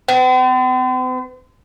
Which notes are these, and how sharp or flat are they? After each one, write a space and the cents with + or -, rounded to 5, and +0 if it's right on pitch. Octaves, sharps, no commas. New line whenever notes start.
C4 -45